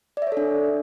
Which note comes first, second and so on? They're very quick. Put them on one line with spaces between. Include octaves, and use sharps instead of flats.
D5 E5 C#5 A4 D4